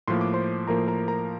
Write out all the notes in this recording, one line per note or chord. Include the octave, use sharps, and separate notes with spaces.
A2 F3 A#3 C6
D6
C5 C6
A2 F3 A#3 A#4 A#5
A#4 A#5
A#4 A#5